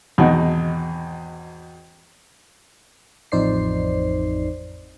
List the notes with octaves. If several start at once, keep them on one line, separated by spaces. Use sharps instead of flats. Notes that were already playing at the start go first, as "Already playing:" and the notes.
G#1 E2 B2 D#4 F#5
A1 F2 D#4 C5 D5 C7